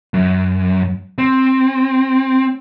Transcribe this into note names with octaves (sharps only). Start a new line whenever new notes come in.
F#2
C4